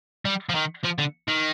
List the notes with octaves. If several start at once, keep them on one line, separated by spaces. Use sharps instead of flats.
G3
F3
D#3
F3
D3
D#3